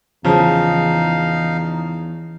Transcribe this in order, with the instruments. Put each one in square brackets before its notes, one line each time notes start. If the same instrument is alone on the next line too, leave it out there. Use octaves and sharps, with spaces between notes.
[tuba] E2 [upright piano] C#3 F3 [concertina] D#4 F5